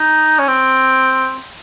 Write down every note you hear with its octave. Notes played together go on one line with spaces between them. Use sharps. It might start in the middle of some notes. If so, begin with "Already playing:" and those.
Already playing: D#4
C#4
C4